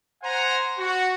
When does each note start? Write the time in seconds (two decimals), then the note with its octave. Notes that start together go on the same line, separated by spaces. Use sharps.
0.23 C5 F#5 G#5 A#5
0.78 F#4